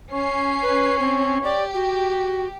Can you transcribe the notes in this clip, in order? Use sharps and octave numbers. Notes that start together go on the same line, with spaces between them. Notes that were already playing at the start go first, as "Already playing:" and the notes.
C#4 C#5 C7
B4
C4
G4 D5
F#4